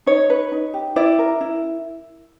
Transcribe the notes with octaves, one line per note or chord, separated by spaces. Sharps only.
D#4 C#5
B4
D#4
G4
E4 D5
A#4
E4